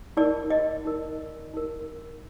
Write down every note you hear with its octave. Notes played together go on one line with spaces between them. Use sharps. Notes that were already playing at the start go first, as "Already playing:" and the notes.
D#4 A#4 D5
D#5
D#4 A#4
D#4 A#4